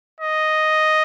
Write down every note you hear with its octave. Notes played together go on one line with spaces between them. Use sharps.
D#5